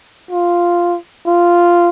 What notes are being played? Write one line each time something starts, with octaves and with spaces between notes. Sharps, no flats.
F4
F4